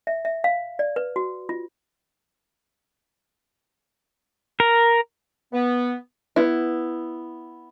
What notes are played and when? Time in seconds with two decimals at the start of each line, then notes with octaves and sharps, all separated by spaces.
0.07 E5
0.25 E5
0.44 F5
0.79 D5
0.96 B4
1.16 F#4
1.49 F4
4.60 A#4
5.53 B3
6.36 B3 E4